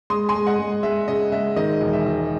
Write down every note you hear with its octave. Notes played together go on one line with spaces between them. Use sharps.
G#3 C6 D#6
G#5 C6
G#3
D#5 F#5
G#3
G#3 E5
C#3 D#5
G#3 E5
D#3 D#5
E1
E5
E1